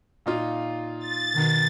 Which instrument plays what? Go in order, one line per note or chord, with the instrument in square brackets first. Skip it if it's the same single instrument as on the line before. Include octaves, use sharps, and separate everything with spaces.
[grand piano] A#2 D#4 F4
[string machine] A6
[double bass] B2 D#3